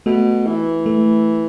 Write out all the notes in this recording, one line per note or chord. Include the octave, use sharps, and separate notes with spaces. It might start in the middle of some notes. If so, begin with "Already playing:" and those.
B2 A3
E3
A3